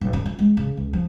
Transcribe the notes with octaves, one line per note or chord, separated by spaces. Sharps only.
B1
D3
F4
G#3
C#3
C#2
F3